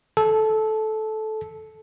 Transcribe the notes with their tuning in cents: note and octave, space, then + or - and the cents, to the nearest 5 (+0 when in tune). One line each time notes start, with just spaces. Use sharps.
A4 -15